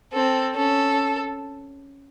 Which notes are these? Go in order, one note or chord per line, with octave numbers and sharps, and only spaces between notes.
C4 A4
C#4 A4